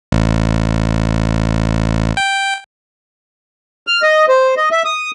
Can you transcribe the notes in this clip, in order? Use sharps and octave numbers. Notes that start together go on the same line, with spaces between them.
A1
G5
F6
D#5
C5
D#5
E5
D#6